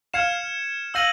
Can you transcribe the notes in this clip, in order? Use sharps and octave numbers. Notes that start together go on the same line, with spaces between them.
F5 F6 G#6 C#7 E7
F5 E6 G6 A#6 D#7 F#7